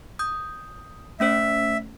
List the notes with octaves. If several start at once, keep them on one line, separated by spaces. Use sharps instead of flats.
D#6 G6
A3 C#4 C5 E5